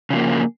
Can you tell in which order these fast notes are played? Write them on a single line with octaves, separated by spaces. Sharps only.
C#3 F3 A#3